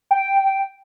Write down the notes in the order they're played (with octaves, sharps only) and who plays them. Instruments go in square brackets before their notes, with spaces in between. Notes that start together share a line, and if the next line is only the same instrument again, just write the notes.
[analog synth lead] G5